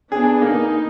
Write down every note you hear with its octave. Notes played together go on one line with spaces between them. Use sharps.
B3 D4 G#4
A#3 D#4